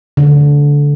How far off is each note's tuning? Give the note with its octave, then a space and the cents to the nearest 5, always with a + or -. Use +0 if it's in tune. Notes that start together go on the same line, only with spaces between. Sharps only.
D3 -20